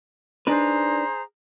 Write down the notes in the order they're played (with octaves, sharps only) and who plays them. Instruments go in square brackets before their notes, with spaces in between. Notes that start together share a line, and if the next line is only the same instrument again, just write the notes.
[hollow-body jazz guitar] D4 D#4 B4 [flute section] G#4 C5 A#5